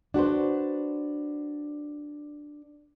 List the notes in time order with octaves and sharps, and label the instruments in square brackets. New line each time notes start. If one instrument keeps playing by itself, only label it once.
[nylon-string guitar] D4 F#4 B4 C5